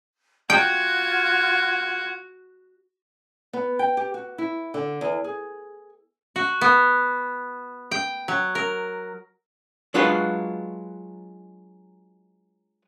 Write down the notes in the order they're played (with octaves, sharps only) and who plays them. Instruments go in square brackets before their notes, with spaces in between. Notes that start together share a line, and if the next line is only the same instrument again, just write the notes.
[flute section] F4 F#5 G#6 [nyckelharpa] F#4 [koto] G5
[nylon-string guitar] B3
G5
G4
F#4
E4
D3
E2
G#4
[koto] F#4
B3
G5
F#3
A#4
[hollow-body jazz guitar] F#3 G#3 D4 F4 F#4 B4